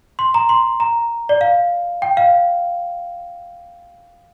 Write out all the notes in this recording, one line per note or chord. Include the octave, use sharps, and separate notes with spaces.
C6
A#5
C6
A#5
D5
F5
G5
F5